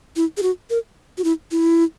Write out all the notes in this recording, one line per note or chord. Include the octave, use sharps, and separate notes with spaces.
E4
G#4
F#4
A#4
F#4
E4
E4